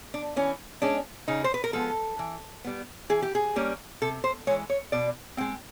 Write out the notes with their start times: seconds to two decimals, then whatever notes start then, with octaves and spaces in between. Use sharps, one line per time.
0.14 D4
0.36 E3 C#4
0.82 G#3 C#4 D4
1.28 C#3 D#4
1.44 C5
1.54 B4
1.64 A#4
1.73 F3 G#3 B3 A4
2.19 E3
2.65 G3 B3
3.10 E3 G#4
3.22 G4
3.35 G#4
3.56 G3 A#3 C#4
4.02 C3 A4
4.24 C5
4.47 G#3 C#5
4.51 E3
4.70 C#5
4.92 B2 D5
5.37 G#3 C4 G5